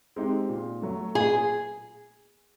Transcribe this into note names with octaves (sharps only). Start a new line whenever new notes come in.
G#3 C4 D#4 G4
A#2
F#3 A3
A#2 G#4